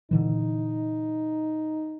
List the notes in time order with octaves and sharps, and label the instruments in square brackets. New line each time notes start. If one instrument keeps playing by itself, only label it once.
[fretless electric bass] A#2 D3 E3 [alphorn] D#4